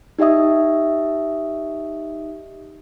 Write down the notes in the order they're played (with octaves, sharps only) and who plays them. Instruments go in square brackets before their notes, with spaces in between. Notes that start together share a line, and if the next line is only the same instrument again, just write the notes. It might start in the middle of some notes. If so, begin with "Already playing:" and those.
[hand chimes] D#4 G4 D#5 E5 D#6